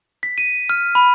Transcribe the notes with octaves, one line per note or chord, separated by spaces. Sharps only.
B6
D#7
F6
B5